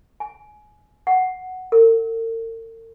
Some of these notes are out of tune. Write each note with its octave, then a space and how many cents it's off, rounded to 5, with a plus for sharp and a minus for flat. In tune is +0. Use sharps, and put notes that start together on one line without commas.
G#5 +20
F#5 +5
A#4 -45